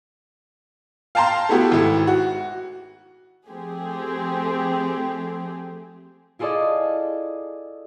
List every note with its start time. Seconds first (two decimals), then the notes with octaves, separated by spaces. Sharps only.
1.15 F5 G5 A5 A#5 C6
1.49 A3 B3 E4 F#4 G4
1.72 G#1 E4
2.07 F#4
3.49 F3 A3 C4 G4 G#4
6.39 E4 F4 G#4 A4 D5 D#5